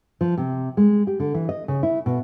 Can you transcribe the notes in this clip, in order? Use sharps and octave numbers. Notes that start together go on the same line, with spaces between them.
F3
C3
G#3
G4
D3
E3
D#5
C#3
E4
B2